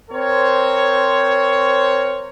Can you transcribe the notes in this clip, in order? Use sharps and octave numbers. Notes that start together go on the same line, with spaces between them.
C4 A#4 C5 C#5